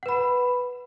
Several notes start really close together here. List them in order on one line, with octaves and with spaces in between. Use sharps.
F#5 B4 B5